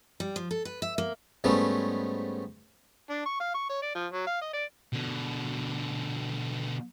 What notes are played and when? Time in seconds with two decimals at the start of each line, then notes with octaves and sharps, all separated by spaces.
0.20 G3
0.36 F3
0.51 A4
0.65 B4
0.82 E5
0.98 A#3
1.44 G#2 G3 A3 B3 C#4
3.10 D4
3.26 C#6
3.40 F5
3.54 C#6
3.69 C#5
3.82 D5
3.95 F3
4.13 F#3
4.27 F5
4.41 D#5
4.54 D5
4.93 B2 D3